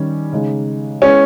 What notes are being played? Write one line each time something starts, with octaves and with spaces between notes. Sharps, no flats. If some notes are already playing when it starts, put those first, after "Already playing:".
Already playing: D#3 G3 C#4
C#3 G#3 D#4
G#3 B3 C#4 E4 G#4